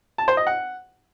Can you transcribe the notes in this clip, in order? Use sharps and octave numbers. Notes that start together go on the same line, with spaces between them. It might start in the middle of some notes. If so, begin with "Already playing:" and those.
A5
C5
D#5
F#5